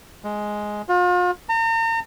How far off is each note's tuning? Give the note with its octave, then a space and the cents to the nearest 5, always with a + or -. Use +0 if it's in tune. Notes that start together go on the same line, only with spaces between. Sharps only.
G#3 +5
F4 +40
A#5 -40